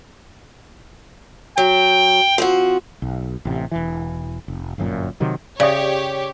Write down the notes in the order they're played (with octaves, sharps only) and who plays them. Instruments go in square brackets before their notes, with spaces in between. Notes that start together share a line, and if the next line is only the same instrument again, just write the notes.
[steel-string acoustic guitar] F#3 [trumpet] G5
[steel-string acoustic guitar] F3 C4 F#4
[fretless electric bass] B1
A1 C3
E1 E3
F1
G1 F#2 A#2
C3 D#3 F#3
[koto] C#3 [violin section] G4 C#5 [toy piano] D5 E5 D#6